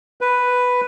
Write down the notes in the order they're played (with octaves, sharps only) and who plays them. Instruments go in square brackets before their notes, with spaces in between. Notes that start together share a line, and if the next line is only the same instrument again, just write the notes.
[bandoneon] B4